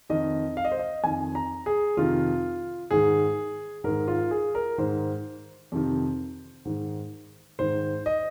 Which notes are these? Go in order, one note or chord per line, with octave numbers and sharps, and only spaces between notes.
F2 D#3 D#5
F5
D#5
C5
D#5
F2 D#3 G#5
A#5
G#4
F2 C3 D#3 F4
G#2 D#3 G#4
G#2 D#3 A#4
F4
G#4
A#4
G#2 D#3 C5
F2 C3 D#3
G#2 D#3
G#2 D#3 C5
D#5